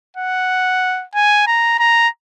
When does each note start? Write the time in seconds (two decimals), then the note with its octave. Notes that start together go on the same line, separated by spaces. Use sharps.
0.17 F#5
1.15 G#5
1.47 A#5
1.79 A#5